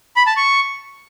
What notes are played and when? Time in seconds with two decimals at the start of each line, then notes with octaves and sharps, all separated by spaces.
0.16 B5
0.27 A5
0.37 C#6